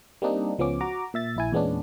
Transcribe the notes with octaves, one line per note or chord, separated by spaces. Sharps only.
G3 A#3 C4 D4 D#4
C#2 F3 B3 C#4 D6
F#4 A#5 D6
A#2 E5 A6
A#1 E4 G#5
E2 A#2 G#3 B3 C#4 D4